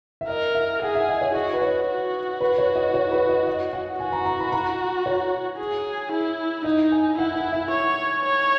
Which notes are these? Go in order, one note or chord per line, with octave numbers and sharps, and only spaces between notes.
E5
A#4 D#5
E5
G#4 F#5
E5
D#5
C#5
F#4 D#5
B4
C#5
F#4
B4
C#5
D#5
C#5
B4
D#5
D#5
F#5
F#4 G#5
A#5
A#5
B5
A#5
C#5
G#4
E4
D#4 D#5
G#5
E4 F#5
F#5
E5
C#5
C#5